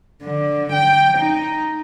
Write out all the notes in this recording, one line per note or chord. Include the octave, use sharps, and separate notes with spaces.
D3
G5
D#4